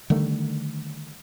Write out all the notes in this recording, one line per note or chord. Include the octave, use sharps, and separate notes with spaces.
D3 D#3 G3 A3